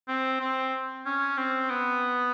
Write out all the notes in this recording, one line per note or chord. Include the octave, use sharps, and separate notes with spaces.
C4
C4
C#4
C4
B3